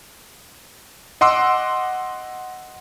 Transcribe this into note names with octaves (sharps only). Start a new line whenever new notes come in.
D#5 F#5 C6 D6 E6